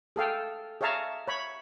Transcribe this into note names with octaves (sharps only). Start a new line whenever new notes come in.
G#4 A4 F5 G5
G#4 C#5 E5 F5 A5 A#5
C#5 B5